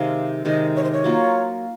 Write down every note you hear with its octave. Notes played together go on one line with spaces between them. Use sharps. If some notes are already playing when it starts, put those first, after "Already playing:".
Already playing: C3 D#3 G#3 F5
C3 D#3 G#3 D#5
C#5
C5
C#5
F#3 A#3 F4